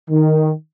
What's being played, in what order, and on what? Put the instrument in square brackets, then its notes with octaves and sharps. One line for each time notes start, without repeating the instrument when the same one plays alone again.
[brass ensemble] D#3